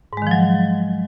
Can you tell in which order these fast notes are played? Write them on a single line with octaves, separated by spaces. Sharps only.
G#2 G#3 D#3 F3 F#3